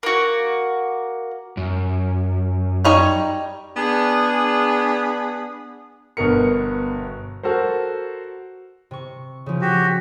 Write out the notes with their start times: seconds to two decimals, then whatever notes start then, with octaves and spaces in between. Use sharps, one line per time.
0.03 A#3 F#4
1.57 F#2
2.85 G3 D#4 C#5
3.77 B3 D4 G#4
6.17 G1 B2 A#4 C#7
7.43 F#4 A4 A#4 C5
8.91 C3 C#6
9.46 C#3 F3
9.61 F#4 G4